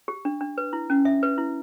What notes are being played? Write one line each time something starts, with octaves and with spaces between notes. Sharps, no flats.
G4
D4
D4
B4
E4
C#4
E5
B4
E4